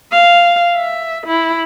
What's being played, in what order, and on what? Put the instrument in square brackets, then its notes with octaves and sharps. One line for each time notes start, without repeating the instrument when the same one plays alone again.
[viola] F5
E5
E4